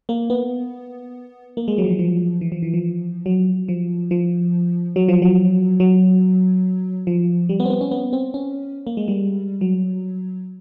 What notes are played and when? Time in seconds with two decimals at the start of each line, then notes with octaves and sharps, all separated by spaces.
0.09 A#3
0.30 B3
1.57 A#3
1.68 G#3
1.78 F#3
1.84 F3
1.89 E3
1.99 F3
2.41 E3
2.52 F3
2.63 E3
2.74 F3
3.26 F#3
3.68 F3
4.11 F3
4.96 F#3
5.08 F3
5.22 F#3
5.80 F#3
7.07 F3
7.49 G3
7.60 B3
7.65 C4
7.70 B3
7.81 C#4
7.91 B3
8.13 C4
8.34 C#4
8.87 A#3
8.97 G#3
9.08 G3
9.61 F#3